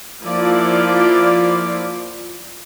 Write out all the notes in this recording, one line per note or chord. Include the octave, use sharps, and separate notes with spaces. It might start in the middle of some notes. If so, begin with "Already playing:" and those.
F3 A#3 E4 F4 D5